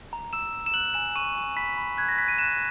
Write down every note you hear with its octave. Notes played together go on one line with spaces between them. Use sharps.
A#5
E6 E7
E6
E7
F#6 F#7
G#5 E7
C#6 D#7
G#5
B5 B6
B5
F#6 G#6
A#6
F#6 B6
D#7
F#6 E7